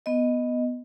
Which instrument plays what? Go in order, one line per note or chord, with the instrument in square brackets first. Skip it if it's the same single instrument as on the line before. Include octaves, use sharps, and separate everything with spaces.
[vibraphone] B3 D#5